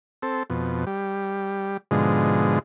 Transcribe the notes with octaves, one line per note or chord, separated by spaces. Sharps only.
C4 A4
F2 B2
G3
G#2 B2 D3 F3 G#3